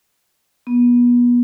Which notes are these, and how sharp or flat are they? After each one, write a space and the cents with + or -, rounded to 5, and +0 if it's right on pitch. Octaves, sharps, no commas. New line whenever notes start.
B3 -30